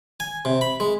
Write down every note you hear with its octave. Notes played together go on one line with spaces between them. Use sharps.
G#5
C3
B5
G#3